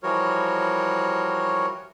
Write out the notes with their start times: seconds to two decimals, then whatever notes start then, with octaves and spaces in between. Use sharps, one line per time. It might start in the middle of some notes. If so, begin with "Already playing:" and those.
0.03 E3 F3 G3 F#4 A#4 C#5